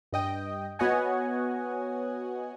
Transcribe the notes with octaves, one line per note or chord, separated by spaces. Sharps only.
G2 D#5 G5
B3 F#4 C#5 D#5 F#5 G#5